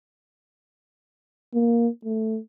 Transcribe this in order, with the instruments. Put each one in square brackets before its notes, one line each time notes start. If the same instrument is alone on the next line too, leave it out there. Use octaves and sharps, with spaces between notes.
[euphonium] A#3
A3